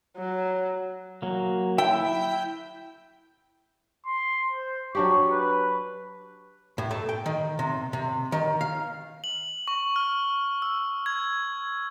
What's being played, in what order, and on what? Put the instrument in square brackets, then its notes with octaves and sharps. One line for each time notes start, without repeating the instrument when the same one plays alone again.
[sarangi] F#3
[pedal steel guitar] F#3 A#3
[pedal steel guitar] E4 E5 [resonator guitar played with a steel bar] G5
[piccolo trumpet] C6
C5
[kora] F#3 D4 G4 [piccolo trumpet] C#6
[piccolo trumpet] B4
[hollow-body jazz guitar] A2
A3
G5
D#3
C3
C3
D#3
F5
[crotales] F#7
C#6
F6
E6
G#6